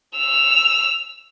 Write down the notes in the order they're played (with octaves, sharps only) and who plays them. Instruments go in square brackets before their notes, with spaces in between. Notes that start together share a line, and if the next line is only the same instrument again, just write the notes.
[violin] E6 F7